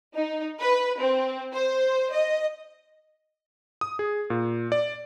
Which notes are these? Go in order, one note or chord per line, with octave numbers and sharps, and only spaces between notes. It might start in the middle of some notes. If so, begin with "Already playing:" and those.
D#4
B4
C4
C5
D#5
D#6
G#4
A#2
D5